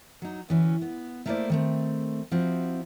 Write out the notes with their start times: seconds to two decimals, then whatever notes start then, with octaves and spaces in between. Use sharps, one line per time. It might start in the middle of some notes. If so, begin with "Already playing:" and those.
0.22 F#3 D#4
0.49 D2 E3 C#4
0.82 B3
1.26 A3 A#3 E4 A#4 C5 D5
1.50 D#3 A3 C4
2.31 F3 C4 E4 F#4